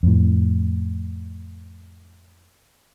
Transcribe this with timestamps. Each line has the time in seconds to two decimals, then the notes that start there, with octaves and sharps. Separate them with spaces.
0.03 F2 A2